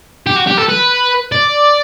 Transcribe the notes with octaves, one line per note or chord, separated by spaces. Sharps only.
G4
F#4
G4
A4
B4
D5